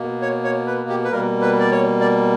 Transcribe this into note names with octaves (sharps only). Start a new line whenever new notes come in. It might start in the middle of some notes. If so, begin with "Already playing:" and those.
Already playing: B2 A#3
C#5
C#5
B4
G4
B4
B2 G3 A#3 A#4
B4
D5
C#5
D5